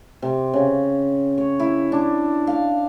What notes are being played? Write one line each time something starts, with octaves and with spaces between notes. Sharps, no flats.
C3
C#3
C#5
E4
D4
F5